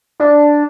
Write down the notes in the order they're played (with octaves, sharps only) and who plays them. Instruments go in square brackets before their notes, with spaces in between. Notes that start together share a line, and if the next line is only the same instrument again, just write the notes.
[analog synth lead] D4